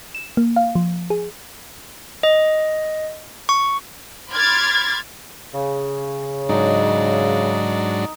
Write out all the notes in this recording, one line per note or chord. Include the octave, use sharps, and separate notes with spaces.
E7
A#3
F5
F3
G#4
D#5
C#6
B5 C6 D6 F6 G#6 A6
C#3
G#2 F#3 D4 D#4